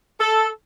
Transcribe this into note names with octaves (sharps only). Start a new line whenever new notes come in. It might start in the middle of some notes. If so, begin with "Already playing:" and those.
A4